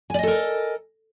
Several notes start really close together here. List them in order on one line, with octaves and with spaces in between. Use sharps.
G#5 D5 D#5 A4 A#4